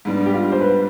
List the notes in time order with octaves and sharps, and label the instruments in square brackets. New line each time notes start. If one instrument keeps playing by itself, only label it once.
[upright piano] G#2 G3 B3 D4
[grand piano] G4
F4
C5
B4